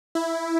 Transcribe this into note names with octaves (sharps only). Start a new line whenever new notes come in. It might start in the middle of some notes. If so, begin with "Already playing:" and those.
E4